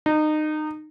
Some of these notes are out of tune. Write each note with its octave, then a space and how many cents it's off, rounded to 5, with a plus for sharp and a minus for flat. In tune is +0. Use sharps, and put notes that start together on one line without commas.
D#4 -25